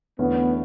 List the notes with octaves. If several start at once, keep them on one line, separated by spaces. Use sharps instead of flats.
E2 D3 A3 B3 C#4 E4